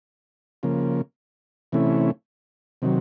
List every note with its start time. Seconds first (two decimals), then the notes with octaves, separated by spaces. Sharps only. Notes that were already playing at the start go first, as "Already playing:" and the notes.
0.63 C#3 F3 A#3
1.72 C3 E3 A3 C#4 E4
2.82 C3 D#3 F#3